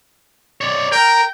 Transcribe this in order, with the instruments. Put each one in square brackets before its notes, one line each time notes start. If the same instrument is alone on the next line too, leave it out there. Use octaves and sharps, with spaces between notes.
[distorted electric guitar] C#5 D5
[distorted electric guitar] A#4 [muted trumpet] G5